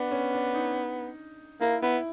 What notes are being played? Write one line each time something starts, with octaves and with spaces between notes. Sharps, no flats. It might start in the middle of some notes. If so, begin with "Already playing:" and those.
Already playing: B3 D4
C#4
D4
D#4
A#3 E4
B3 E4